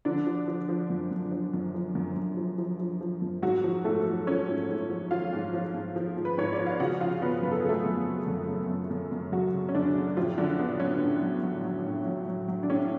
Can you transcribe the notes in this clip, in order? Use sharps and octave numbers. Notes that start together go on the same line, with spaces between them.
D3 F3 D4
F3
F3
F3
F#2
F#2
F3
F#2
F3
F#2
F#2
F3
F3
F3
F3
F#2
G#2 F#3 F#4
F3
G#2 A3 A4
F3
F3 C#4 C#5
G#2
G#2
F3
F3 F4 F5
G#2
F3
G#2
F3
G#2
B4
G#2 C#5
D5
F3
F5
C#3 F#4 F#5
F3 F4 F5
C#3 B3 B4
F#2 B4
A4
G#4
C#3 A3 A4
F#2
C#3
F#2
C#3
F#2
F#2
F#2
C#3 F#3 F#4
C#3
C#4
F#2 D3 D4
C#3
A2 F3 F4
D3 F#3 D4
F#3 B3
F#3 C#4
A2
F#3
F#3
F#3
A2
F#3
F#3
F#3
D4
A2 C#4